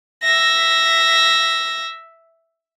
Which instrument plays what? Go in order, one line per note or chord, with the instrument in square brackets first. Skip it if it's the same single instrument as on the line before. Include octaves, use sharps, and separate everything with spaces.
[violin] E5 A#6